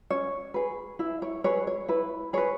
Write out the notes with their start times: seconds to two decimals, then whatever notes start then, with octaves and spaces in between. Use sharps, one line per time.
0.10 C#4 C#5
0.54 G#4 B4
0.99 E4 E5
1.22 C#5
1.44 G#4 B4 C#5
1.67 C#5
1.88 E4 B4
2.33 G#4 B4 C#5